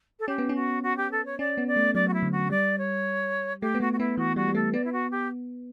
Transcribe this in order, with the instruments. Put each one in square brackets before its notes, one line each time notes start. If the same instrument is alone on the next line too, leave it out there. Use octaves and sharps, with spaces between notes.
[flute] A4
[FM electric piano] C#4 [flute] G4
[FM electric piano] B3
C#4
[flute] F#4
F#4
G4
A4
C#5
[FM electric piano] C#4 [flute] D5
[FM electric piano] B3
[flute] D5
[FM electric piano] A3
[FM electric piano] F#3 [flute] D5
[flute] F#4
E4
[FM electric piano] D3
[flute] F#4
[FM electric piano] G3 [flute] D5
[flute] C#5
[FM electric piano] A3 [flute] G4
[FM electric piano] B3
[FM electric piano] A3 [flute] F#4
[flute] F#4
[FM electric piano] B3 [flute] E4
[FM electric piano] E3 [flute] F#4
[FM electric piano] G3 [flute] F#4
[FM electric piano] G3
[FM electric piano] A3 [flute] A4
[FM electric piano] B3 [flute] D5
[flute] E4
F#4
G4